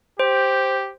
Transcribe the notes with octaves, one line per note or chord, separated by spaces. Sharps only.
G4 C5